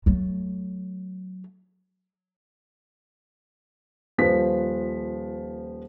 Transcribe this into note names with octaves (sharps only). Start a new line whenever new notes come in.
F#3 A3
D#1 F3 B4 B6